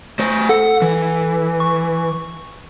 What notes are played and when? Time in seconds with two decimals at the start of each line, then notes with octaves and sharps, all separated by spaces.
0.19 A3 C5
0.49 A4 F#5
0.82 E3
1.60 C#6